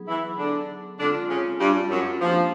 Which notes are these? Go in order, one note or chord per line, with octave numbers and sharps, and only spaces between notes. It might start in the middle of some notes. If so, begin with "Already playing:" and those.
Already playing: F#3 B3 D#4 G#4
E3 E4
D3 D4
D3 G#3 C4 D4 F4
C#3 C#4
G2 G3
F#2 F#3
F3 A#3 D4 G4 C5